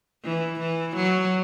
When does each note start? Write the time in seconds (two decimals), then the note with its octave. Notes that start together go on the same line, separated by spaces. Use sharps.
0.24 E3
0.60 E3
0.96 F#3